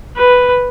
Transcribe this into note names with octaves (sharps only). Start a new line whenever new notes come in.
B4